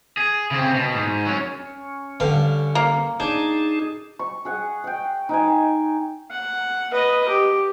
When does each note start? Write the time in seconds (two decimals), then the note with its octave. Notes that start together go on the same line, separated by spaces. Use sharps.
0.17 G#4
0.51 C#3 C4
0.75 B2
0.93 G#2
1.26 F#3 C#4
1.60 C#4
2.20 G2 D3 F5
2.75 A#3
3.20 D4 D#4 G#4 A5
4.19 C#6
4.45 G#4 F#5
4.84 F#5 G5
5.29 D#4 G5 G#5
6.31 F#5
6.92 B4 D#5
7.28 G4